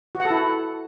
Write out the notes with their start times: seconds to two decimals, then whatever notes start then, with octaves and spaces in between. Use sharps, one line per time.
0.15 F#4
0.20 F#5
0.25 A4
0.30 E4